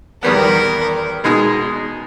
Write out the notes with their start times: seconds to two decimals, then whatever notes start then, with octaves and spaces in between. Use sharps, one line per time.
0.23 E2 D#3 G3 B3 A#4
1.24 B2 G#3 D#4 G#4